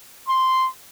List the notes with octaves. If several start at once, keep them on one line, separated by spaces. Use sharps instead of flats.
C6